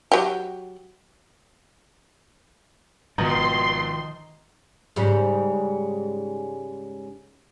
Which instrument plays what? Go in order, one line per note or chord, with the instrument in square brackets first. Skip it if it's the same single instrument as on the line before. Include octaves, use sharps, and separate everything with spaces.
[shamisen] F#3 G4
[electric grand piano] G#1 B2 A#5 [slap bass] D#3 F3 [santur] D#4 [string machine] C6
[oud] G#2 C#3 G3